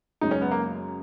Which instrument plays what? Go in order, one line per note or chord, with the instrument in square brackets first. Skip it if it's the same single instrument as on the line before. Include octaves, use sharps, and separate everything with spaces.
[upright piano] F#2 C#3 G#3 [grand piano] D#4
[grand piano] C#4
B3
A#3